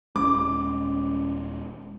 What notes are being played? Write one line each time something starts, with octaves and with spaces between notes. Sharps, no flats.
D#1 G#3 C#4 D6